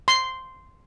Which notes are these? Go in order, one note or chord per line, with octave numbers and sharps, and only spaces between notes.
C6